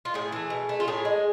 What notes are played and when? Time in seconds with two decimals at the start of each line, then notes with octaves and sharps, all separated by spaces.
0.05 F4
0.14 A2 G#4
0.32 E3 A3
0.50 B2
0.69 A3
0.80 F4
0.88 A2 G#4
1.05 G#3